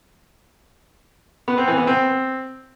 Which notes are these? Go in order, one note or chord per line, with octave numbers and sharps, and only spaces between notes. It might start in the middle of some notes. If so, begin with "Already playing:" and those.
B3
C4
E3
B3
C4